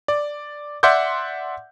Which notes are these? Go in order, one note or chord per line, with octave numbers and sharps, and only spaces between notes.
D5
D5 E5 F#5 C6 D6 G6